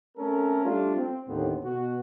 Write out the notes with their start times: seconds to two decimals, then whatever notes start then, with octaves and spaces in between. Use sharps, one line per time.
0.18 A3 C4 C#4 A4 A#4
0.65 G3 A3 D4 F4
0.97 C4
1.28 D#2 A2 D3 B3 C4
1.64 B2 F#4